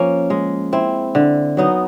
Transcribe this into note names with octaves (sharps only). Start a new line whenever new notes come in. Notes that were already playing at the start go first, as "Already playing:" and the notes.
Already playing: F3 A#3 C#4
G#3
C4 E4
D3
F#3 B3 D#4